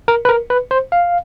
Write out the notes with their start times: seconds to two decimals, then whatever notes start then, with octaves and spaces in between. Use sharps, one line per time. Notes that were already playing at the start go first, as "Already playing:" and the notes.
0.08 A#4
0.25 B4
0.29 A#4
0.50 B4
0.71 C5
0.92 F5